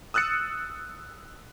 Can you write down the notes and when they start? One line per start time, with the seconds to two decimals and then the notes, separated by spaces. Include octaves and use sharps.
0.14 D#6 E6 F#6 A6 C#7